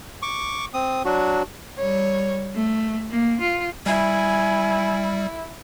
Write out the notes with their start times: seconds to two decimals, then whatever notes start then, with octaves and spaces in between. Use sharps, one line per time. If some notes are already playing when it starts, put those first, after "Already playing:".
0.22 C#6 D6
0.74 C4 D#6
1.05 F#3 D4 F#4
1.78 G3 C#5
2.55 A3
3.10 A#3
3.40 F4
3.86 G3 E4 G#5